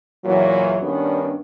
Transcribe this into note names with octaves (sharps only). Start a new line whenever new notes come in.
E2 A#2 E3 F#3
G2 D#3 B3 C#4 D4